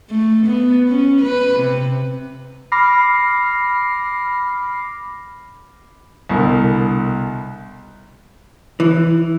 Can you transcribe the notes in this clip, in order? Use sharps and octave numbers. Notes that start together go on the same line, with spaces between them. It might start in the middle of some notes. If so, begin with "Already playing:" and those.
A3
B3
C#4
B4
C3
B5 D6 F6 A#6 C7
C2 B2 D3 A#4
E3